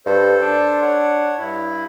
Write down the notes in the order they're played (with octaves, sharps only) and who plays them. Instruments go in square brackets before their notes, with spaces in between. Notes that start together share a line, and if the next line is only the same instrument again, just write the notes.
[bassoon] G2 [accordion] A4 C5
[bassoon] D4
[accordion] C#5 F#5
G2 E4